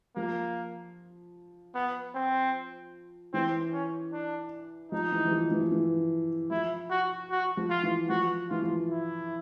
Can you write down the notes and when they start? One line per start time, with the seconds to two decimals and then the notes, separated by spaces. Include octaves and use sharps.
0.16 F3 A#3
1.75 B3
2.15 C4
3.34 E3 C4
3.73 C#4
4.13 D4
4.92 F3 D#4
5.12 E3
5.25 E3
5.32 F3
5.51 E3
5.61 F3
5.72 E3
6.51 F3 E4
6.90 F#4
7.31 F#4
7.57 F3
7.70 F4
7.83 E3
8.09 F3 F#4
8.49 E3 F4
8.62 F3
8.89 E4